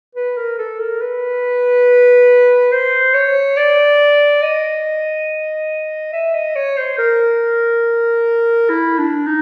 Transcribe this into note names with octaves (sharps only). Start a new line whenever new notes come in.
B4
A#4
A4
A#4
B4
C5
C#5
D5
D#5
E5
D#5
C#5
C5
A#4
E4
D4
D#4